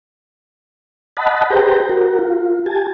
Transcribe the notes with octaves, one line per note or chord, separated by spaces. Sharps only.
D#5 F#5 A5 B5
G4 G#4 B4 C5 G5 A#5
F#4 A#4
F4
G4 G#5 A5